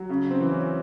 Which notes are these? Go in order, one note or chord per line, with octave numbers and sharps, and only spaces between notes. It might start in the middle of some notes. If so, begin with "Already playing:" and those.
Already playing: F#3
C#3
C4
E3
C#4